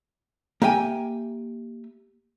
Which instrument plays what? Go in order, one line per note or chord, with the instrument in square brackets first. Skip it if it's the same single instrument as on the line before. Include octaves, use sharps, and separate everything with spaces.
[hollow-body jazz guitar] A#3 G4 E5 G5 G#5